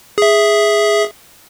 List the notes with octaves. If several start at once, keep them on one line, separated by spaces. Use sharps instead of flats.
G#4 E5